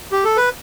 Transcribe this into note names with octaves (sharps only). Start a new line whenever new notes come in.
G4
A4
B4